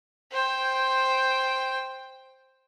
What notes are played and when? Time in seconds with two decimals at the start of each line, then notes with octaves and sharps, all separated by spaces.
0.32 C5 G5